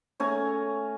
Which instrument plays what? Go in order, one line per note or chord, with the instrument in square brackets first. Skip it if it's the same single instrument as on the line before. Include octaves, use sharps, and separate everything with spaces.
[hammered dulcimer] A3 C#4 G#5 A#5